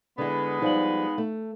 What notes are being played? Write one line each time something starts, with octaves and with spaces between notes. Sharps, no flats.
D3 G#3 B3 E4
F3 G3 D#4 F5 F#7
A3